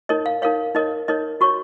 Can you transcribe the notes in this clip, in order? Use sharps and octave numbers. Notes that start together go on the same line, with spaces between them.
D#4 A#4 C#5 D#5
F5
D#4 A#4 C#5 F5
D#4 A#4 C#5 D#5
D#4 A#4 C#5 D#5
F#4 C#5 C#6